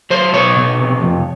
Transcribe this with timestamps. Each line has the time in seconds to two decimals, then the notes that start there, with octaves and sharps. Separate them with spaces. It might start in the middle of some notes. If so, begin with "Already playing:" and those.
0.10 F#3 C5
0.33 B2 C#5
0.56 B2
0.79 C3
1.02 F2